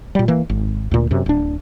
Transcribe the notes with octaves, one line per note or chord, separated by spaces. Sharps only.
A#2 G3
E3 A#3
G#1
D2 A#2
F#2 C3
D1 D4